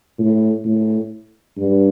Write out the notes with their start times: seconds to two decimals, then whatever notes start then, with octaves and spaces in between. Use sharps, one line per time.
0.19 A2
0.65 A2
1.57 G2